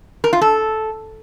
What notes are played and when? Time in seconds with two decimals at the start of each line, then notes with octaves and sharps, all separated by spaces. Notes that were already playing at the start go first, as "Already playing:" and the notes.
0.24 A#4
0.33 F4
0.41 A4